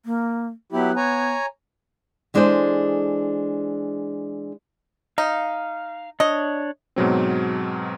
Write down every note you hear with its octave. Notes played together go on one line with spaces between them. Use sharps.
A#3
F#3 B3 E4 G4
C#5 G#5 A#5
E3 G#3 D4 G#4 A4 C5
D#4 F5
D4 C#5 D#5
G#2 B2 F#3 C4